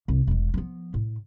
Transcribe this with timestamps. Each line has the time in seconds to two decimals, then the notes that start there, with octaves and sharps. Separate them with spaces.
0.08 C2
0.27 E1 G#3
0.54 F3 B3
0.94 A2